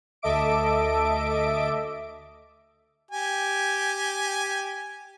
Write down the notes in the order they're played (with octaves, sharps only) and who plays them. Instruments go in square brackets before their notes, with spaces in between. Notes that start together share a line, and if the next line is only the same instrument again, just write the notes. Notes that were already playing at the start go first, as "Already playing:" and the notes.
[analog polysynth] D2 A4 D#5 E5 D6 D7
[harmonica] G4 G#5